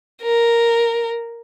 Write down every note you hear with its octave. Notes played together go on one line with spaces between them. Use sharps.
A#4